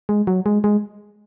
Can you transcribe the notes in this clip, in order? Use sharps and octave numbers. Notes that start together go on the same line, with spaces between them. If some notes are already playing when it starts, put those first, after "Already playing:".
G#3
F#3
G#3
G#3